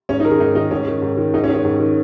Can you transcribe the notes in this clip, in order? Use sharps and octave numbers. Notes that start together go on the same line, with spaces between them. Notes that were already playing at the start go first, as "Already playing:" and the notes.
G#2 C#4
D#4
D#3 A#4
G#4
G#2 D#4
D#3 D#4
G#2 C#4
D#3
G#2
D#3
G#2 D#4
C#4
D#3
C#4
G#2
D#3